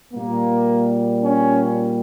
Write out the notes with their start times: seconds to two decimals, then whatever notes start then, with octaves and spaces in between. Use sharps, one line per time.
0.13 A#2 G3 A#3
1.24 C#4